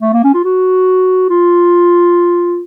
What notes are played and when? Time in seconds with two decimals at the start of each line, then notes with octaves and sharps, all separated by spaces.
0.01 A3
0.13 A#3
0.24 C#4
0.34 F4
0.44 F#4
1.30 F4